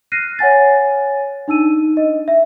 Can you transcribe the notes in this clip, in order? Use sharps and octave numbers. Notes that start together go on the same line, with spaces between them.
F6 F#6 A#6 C7 D#7
C#5 F#5 G#5 A6
D4 D#4 E6 D#7
D#5
E5